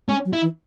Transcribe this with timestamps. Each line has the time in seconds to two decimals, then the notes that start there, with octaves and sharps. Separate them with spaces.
0.08 G#3 C#4
0.25 F#3
0.33 E4
0.42 E3